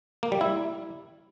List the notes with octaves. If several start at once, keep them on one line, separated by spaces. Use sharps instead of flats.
A#3
G3
E4